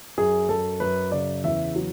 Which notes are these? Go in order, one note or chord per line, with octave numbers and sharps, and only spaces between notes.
F#2 G#4
F#2 A4
F#2 B4
C#3 D5
E2 E5
F#3